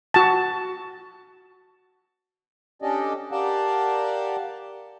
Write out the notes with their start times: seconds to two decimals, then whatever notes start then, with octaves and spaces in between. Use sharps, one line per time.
0.14 F#4 A5
2.82 C#4 D4 G4 A4 D5 D#5
3.32 G4 A#4 D5 F5 F#5 A5